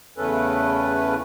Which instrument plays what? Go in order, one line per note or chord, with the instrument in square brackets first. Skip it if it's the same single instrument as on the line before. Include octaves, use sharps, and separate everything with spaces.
[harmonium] E2 C#3 A3 C#4 A4 B4